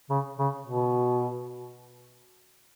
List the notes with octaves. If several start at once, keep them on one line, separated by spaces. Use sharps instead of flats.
C#3
C#3
B2